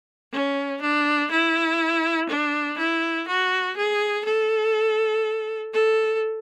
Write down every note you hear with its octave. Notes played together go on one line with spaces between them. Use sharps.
C#4
D4
E4
D4
E4
F#4
G#4
A4
A4